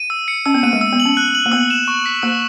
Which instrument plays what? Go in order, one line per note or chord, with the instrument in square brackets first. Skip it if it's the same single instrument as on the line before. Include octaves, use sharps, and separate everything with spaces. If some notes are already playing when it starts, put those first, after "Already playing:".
Already playing: [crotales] D#7
E6
C#7
[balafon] C#4 [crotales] E6
[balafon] B3
[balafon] A#3 [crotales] D#7
[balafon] G#3
[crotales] E6
[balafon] B3
[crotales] F#7
[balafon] C#4
[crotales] F#6
F#7
[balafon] A#3
[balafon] B3 [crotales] E6
[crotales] E7
C#6
B6
[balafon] A#3 [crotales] E6